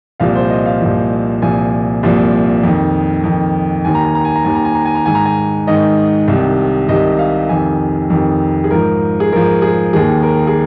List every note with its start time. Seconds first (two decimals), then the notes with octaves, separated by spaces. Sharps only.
0.20 C2 A#2 F3 F5
0.35 C5
0.50 D#5
0.66 F5
0.81 C2 A#2 F3
1.42 C2 A#2 F3 G#5
2.03 C2 A#2 F3
2.63 F2 D#3
3.24 F2 D#3
3.85 D#2 D#3 G#5
3.95 A#5
4.05 G#5
4.15 A#5
4.25 G#5
4.36 A#5
4.45 D#2 D#3 G#5
4.55 A#5
4.65 G#5
4.75 A#5
4.86 G#5
4.95 A#5
5.06 G#2 D#3 G#5
5.15 A#5
5.25 G#5
5.67 G#2 D#3 D#5
6.28 C2 C3 D#3
6.89 C2 C3 D#3 D#5
7.19 F5
7.49 F2 C3 D#3 G#5
8.10 F2 C3 D#3
8.64 G#4
8.71 G#2 F3 A#4
9.20 G#4
9.32 G#2 F3 A#4
9.62 G#4
9.93 D#2 D#3 G#4
10.23 A#4
10.47 G#4